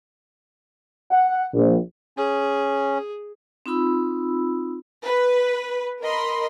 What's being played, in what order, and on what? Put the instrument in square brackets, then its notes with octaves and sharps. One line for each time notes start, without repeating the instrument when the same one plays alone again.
[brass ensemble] F#5
A#1
[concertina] C#4 [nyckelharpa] G#4
[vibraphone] C4 D#4 F4 B5 E6
[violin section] B4
A#4 D#5 B5 C6